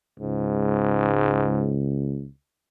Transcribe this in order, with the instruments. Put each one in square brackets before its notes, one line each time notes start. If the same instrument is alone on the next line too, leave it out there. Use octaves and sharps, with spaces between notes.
[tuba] C#2 [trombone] G#2